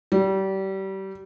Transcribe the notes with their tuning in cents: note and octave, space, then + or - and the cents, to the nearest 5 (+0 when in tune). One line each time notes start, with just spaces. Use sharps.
G3 -30